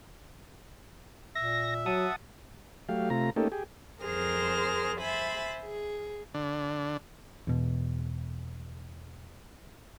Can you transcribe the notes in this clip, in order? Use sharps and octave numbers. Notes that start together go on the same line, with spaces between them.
A#2 E5 A#6
F#3 F#5 A5 D#6
F#3 A3 G4 F5
C3 A3 F4 A#5
A3 A#3 C#4 D#4 G4 A4
G4 G#4
F2 G#4 A#4 C5 F6 A#6
C5 E5 G#5 B5 A6
G#4
D3
E2 B2